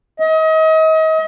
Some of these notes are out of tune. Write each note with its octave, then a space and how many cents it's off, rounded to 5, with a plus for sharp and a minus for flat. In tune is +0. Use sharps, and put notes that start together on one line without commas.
D#5 +35